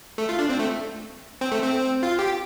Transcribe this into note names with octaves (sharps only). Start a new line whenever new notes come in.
A3
F4
D4
C4
A3
C4
A3
C4
F4
G4